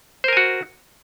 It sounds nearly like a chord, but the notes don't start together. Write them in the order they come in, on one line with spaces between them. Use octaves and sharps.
C5 A#4 G#5 F#4